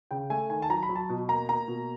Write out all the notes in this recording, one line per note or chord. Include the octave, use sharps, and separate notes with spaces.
C#3 G5
A3 G#5
D#3 G#5
A5
F#3 A#5
B5
F#3
A5
B2
A#3 A#5
A#3 A#5
B2